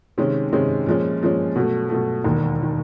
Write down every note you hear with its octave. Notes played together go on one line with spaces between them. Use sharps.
C3 D#3 G#3 C#4
C3 D#3 G#3 C#4
A#2 F3 G#3 C#4
A#2 F3 G#3 C#4
B2 F#3 A3
B2 F#3 A3
E1 D#2 D#3
D#3